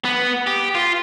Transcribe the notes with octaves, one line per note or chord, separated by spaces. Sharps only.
B3
G4
F4